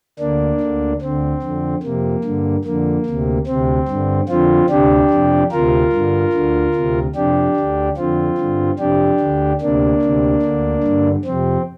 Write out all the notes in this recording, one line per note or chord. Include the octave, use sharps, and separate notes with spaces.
D2 D3 A#3 D4
D2 D3
D2 D3 C4
F2 D3
F2 C3 A#3
G2 D3
F2 D3 A#3
D2 C3
D2 C3 C4
G2 D3
F2 D3 C4 F4
D2 C3 D4 G4
F2 C3
D2 C3 F4 A#4
G2 D3
D2 D3
D2 C3
F2 C3 D4 G4
D2 D3
F2 D3 C4 F4
G2 D3
F2 C3 D4 G4
D2 D3
D2 C3 A#3 D4
D2 C3
D2 D3
G2 D3
F2 C3 C4